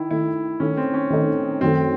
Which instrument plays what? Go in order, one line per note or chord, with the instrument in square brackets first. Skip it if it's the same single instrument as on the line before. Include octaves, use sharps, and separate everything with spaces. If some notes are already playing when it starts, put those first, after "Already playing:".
Already playing: [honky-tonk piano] D#3 [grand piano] E4
[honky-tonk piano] D#3 A3 D#4 [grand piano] E4
[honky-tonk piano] D#3 A3 D#4 [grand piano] C#4
[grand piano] C4
C#4
[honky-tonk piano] D#3 A3 D#4
[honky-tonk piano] F#2 D#3 A3 [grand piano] C4